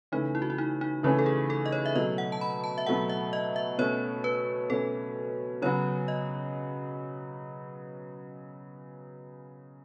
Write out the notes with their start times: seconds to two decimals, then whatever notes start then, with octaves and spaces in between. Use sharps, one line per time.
0.12 C#3 E3 A3 C#4 D#4
0.35 E4
0.42 F#4
0.50 E4
0.58 D#4
0.81 D#4
1.03 C#3 E3 A3 C#4 E4
1.19 A4
1.26 G#4
1.50 A4
1.66 D#5
1.72 C#5
1.86 E5
1.95 B2 F#3 A3 D#5
2.18 F#5
2.32 A5
2.41 B5
2.64 A5
2.78 E5
2.86 B2 F#3 A3 F#5
3.09 E5
3.33 D#5
3.56 E5
3.78 B2 A3 C#4 C#5
4.24 B4
4.70 B2 A3 C#4 A4
5.62 C#3 F#3 B3 F#4 C#5
6.08 D#5